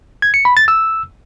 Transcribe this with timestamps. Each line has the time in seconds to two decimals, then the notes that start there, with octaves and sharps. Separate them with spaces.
0.22 G#6
0.34 C#7
0.45 B5
0.57 A6
0.68 E6